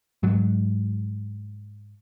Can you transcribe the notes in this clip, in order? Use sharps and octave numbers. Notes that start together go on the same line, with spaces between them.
G#2 F#3